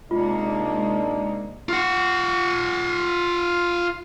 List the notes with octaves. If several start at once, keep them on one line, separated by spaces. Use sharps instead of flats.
C3 G#3 A#3 D4 D#4 F4
F4 F#5